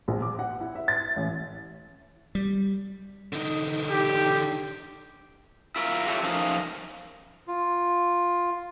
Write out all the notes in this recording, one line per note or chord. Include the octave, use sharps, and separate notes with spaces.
A#1
D6
F#5
E4
E5
A6
A1
G3
D3 D#4
G4
E4 F4 A#4 B4 E5
F4 G4 A4 C#5 E5
F3 A3 C#4 D#4 A#4 F5
F4